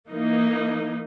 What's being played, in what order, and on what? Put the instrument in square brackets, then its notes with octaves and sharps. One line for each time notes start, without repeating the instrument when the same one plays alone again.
[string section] E3 A#3 D#4